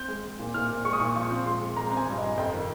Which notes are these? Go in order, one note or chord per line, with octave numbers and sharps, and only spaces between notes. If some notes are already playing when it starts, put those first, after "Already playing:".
Already playing: C4 G6
G#3
G#3
A#2
A#2 F6
A#2
G#3 C#6
D#6
A#2 C#6
F3 C#6
C4
G#3 C6
G#3
G#3 A#5
C4 G#5
G2
D#5
G2
F2 G5
D#3